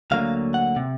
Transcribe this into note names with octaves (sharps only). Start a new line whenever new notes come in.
D2 D3 F#3 A#3 F5
F#5
C3